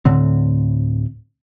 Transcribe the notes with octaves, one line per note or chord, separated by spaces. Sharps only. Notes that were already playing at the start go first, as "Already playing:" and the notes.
D2 A2 D3 C4